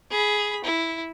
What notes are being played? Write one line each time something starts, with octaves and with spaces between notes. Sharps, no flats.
G#4 B5
E4